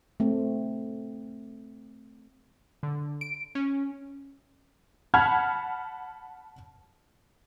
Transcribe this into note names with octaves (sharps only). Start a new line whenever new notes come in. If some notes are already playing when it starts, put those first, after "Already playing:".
A3 C4
D3
D7
C#4
F#5 A5 B5 F6 G#6